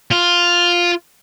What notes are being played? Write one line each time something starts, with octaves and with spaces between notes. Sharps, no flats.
F4